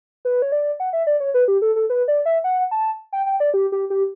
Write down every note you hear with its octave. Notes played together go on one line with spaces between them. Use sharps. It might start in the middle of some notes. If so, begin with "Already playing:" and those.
B4
C#5
D5
F#5
E5
D5
C#5
B4
G4
A4
A4
B4
D5
E5
F#5
A5
G5
G5
D5
G4
G4
G4